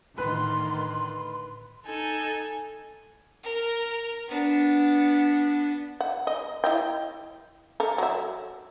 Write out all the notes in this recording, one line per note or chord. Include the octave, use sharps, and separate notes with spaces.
A2 D3 D#3 B4 C6
D#4 A4 G#5
A#4
B3 D4
F#5
D#5
E4 D#5 G5
A4 A#4
F#3 E5